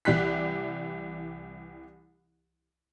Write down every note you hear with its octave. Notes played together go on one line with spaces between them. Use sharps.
C2 E3 G4 D5 F#6 B6